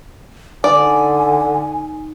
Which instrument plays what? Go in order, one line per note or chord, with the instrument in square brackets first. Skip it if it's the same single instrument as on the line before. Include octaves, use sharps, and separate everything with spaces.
[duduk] D3 [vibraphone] D#4 [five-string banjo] D5 [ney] G#5